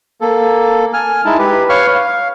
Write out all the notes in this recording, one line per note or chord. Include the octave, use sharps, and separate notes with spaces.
A#3 A4
G#5 F6
G#3 D#4 E4 A5
G4 B4
B4 C#5 F5 C#6 F6
F5